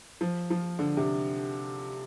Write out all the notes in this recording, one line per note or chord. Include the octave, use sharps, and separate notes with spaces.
F3
F3
D3
C3